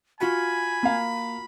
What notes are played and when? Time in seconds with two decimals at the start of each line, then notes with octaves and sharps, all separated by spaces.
0.21 F4 F#4 F#5 G#5 B5
0.83 A#3 F5